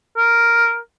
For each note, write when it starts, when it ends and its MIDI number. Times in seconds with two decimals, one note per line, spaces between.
0.17 0.77 70